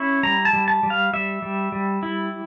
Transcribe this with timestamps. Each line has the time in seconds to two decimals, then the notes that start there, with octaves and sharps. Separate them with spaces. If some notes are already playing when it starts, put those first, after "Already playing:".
Already playing: C#4 E4 C#6
0.23 G3 A#5
0.45 A5
0.53 G3
0.68 A5
0.83 G3
0.90 F5
1.13 G3 E5
1.42 G3
1.72 G3
2.03 E4